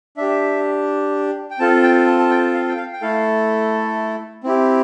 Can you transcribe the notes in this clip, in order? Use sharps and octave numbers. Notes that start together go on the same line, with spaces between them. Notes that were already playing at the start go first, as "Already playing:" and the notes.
D4 G4 E5
G5
C4 F4 A4 A5
G5
A5
A5
G5
F5
G5
F5
G5
A3 E4 A4 F5
C4 E4 G4